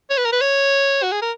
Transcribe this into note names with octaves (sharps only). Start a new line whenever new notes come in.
C#5
B4
A#4
B4
C#5
F#4
G#4
A#4